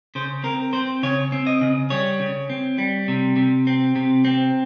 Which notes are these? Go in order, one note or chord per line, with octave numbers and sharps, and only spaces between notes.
C#3 C5
C4 A#4
C4 C5
C#3 C#5
C4
D#5
C#3
G3 C#5
C#3
C4
G3
C3
C3
C4
C3
C4